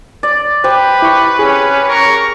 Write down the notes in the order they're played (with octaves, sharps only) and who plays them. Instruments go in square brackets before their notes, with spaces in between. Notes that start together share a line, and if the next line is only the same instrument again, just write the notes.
[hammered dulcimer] D5
[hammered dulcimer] G4 [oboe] B4 [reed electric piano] C5
[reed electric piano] E4 C#6
[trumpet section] C4 C#4 [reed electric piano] G#4
[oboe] A#4 [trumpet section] C#5 A#5 C#6